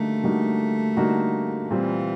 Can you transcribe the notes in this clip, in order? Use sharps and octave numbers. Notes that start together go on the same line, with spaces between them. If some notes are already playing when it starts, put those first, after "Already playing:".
Already playing: D3 G3 A3 A#3 D#4 F#4
D3 G3 A#3 D#4 F#4
D3 G3 A#3 D#4 F#4
A#2 E3 G3 C4 F4